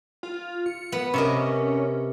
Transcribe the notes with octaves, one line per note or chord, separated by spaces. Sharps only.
F4
C#7
B3
C3 C#4 A#4 D#5